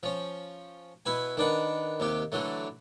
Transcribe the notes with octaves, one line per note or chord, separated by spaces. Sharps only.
F3 C#4
B2 E4 B4 G#5
D#3 D4 B4 F#5
D#2 C3 G4
D3 E3 F#3 A3